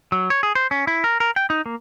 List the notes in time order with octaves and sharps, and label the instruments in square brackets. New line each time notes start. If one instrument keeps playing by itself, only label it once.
[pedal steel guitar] F#3
C#5
G#4
C5
C#4
E4
A#4
A#4
G5
D#4
A#3